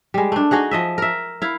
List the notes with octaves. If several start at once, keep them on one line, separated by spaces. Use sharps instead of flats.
G3 G#3
A3 D4
D#4 F#4 G#4 F#5
F3 D#5 E5
A#4 E5
E4 F5